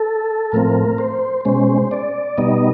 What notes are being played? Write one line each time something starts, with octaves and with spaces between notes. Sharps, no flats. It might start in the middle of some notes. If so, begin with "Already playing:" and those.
Already playing: A4
A2 F3 A3 C4 A#4
C5
B2 G#3 C#4 C5
D5
B2 G3 B3 D#4 D#5